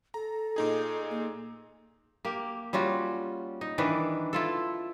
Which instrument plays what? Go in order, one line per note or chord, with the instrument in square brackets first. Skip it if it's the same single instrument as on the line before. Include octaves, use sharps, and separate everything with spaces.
[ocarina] A4 [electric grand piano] A#5
[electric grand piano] A#2 D#4 G#4
[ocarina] A#3
[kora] A#3 G4
G3 C#4 F4 F#4
D#4
D#3 E3 D4 B4
E4 F4 A4